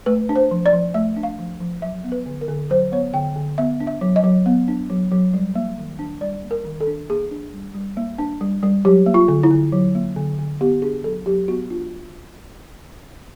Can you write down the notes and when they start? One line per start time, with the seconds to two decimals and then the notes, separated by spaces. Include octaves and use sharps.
0.06 A3 B4
0.29 D4
0.36 C5
0.51 F3
0.66 D5
0.73 F3
0.94 A3 E5
1.17 D4
1.23 F5
1.39 F3
1.60 F3
1.82 F#3 E5
2.04 B3
2.12 B4
2.26 D3
2.41 A#4
2.48 D3
2.70 F#3 C5
2.92 B3 C#5
3.14 D3 G5
3.36 D3
3.58 B3 E5
3.80 D4
3.87 E5
4.01 F#3
4.16 D#5
4.24 F#3
4.46 B3
4.68 D4
4.90 F#3
5.12 F#3
5.33 G3
5.55 A#3
5.78 D#3
5.99 D4
6.21 G3 D5
6.43 A#3
6.51 A#4
6.65 D#3
6.80 A4
6.87 D4
7.09 A#3 G#4
7.31 D4
7.53 G3
7.75 G3
7.97 A#3
8.19 D4
8.41 G3
8.63 G3
8.85 F#3 G4
9.06 A#3
9.14 F4
9.28 D3
9.43 E4
9.51 D3
9.72 F#3
9.95 A#3
10.16 D3
10.39 D3
10.61 B3 G4
10.82 D4 G#4
11.04 F#3 A4
11.26 F#3 G4
11.48 B3 F#4
11.70 D4 F4